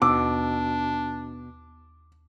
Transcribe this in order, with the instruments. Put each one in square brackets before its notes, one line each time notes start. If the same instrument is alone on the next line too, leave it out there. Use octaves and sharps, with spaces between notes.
[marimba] D#2 E6 [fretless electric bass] B2 [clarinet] D4 [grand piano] D6